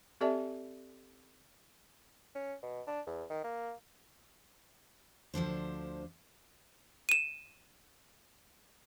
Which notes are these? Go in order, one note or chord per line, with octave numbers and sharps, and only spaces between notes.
C4 G4 A4 D5 E5 A5
C#4
B2
D4
E2
D#3
A#3
D2 F3 D4 C5
D#7 E7